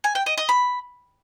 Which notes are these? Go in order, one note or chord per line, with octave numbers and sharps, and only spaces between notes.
G#5
G5
D#5
D#5
B5